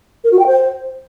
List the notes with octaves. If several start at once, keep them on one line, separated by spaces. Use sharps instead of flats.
A#4
F#4
G5
C5